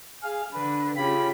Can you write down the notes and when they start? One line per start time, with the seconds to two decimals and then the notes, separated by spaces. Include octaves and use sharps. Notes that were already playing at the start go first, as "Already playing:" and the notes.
0.23 G#4 F5
0.53 D3 B4
0.96 C#3 F4 G4 B5